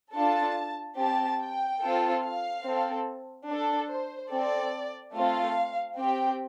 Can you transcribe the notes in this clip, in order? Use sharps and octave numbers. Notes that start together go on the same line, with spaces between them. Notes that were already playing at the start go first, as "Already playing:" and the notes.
D4 F4 A4 A5
C4 G4 A5
G5
C4 F4 A4
F5
C4 A4
D4 A4
C5
C4 A4 D5
A3 C4 F4 A4 F5
C4 G4 G5